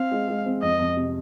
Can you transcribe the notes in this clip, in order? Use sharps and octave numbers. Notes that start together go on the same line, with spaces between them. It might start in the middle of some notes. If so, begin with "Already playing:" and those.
Already playing: C4 F5
G#3
G#3
C4
F2 D#5
F2
C3